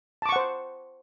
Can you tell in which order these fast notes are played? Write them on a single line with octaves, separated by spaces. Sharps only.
A5 D6 C#6 F#5 C5